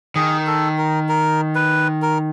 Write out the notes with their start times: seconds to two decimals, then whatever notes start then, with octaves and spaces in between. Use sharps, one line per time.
0.15 D#3 G#4
0.47 A4
0.78 A#4
1.09 A#4
1.55 B4
2.02 A#4